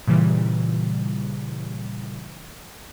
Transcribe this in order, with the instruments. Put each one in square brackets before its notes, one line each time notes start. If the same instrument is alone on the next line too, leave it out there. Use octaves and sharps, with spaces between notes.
[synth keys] A#2 C#3 E3 G3